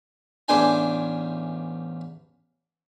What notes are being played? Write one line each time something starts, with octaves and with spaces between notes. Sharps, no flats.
A1 E2 D4 C5 G5 G#5